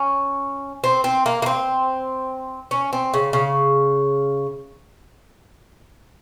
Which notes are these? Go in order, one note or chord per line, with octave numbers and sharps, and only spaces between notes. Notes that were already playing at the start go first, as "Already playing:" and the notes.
Already playing: C#4
C4
C4
A#3
A#3
C4
C#4
C4
C#3
C#3